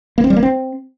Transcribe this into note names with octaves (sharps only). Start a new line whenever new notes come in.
A#3
C4
G3
A#3
C4